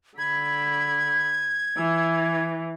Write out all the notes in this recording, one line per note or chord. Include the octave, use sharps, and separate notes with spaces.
D3 B5 G#6
E3